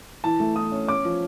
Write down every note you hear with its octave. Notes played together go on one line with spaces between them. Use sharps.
E3 A5
A3
E3 D#6
C#4
C#4 D6
F3